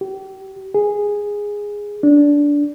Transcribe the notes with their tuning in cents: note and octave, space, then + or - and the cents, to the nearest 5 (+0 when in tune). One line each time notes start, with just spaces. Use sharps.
G4 -35
G#4 -10
D4 -15